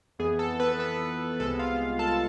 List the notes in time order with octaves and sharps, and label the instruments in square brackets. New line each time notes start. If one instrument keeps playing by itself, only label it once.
[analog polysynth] F2 E3 B3 G#4
A4
B3 B4
B3 B4
C2 C3 G#3 B3 A4
F4 F5
A4 A5